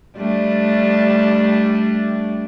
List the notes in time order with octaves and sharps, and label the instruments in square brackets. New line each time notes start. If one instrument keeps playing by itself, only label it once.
[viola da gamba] G3 A3 D4